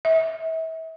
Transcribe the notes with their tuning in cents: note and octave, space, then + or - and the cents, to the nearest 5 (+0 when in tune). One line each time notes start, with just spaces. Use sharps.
E5 -35